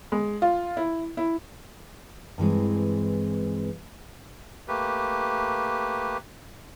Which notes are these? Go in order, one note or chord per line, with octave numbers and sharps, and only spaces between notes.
G#3
F4
E4
E4
G2 E3 G#3 C4
A3 A#3 G4 B4